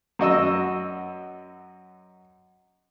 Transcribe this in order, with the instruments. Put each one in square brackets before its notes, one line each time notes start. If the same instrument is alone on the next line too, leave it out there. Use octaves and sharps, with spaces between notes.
[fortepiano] F#2 F#4 D#5 E6